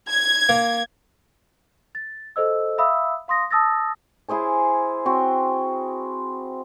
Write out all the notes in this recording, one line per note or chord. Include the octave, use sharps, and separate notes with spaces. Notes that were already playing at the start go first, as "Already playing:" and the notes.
G#6
A#3
A6
A4 C5 D#5 E6
E5 F5 B5 D#6 E6
F5 C6 D#6 A#6
A5 D#6 E6 A6 A#6
E4 G#4 C5 G#5
C4 F#4